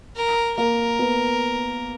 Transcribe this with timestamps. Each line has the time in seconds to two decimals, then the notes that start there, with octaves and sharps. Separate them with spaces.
0.16 A#4
0.57 A#3 A#4
0.99 B3